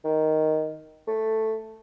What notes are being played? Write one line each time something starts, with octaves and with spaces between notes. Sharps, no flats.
D#3
A3